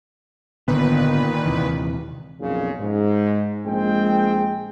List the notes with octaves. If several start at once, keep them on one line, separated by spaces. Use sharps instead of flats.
G#1 A#2 D3 D#3 B3 B4
D#2 C3 E3
B1 F2 A#2 C#3
G#2
A#1 G#3 C4 G#4 G5